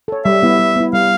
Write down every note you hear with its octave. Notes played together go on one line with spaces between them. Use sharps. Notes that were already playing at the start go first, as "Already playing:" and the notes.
A4 C#5
G3 E5
B3 E4
G3
B3 E4
G3 F5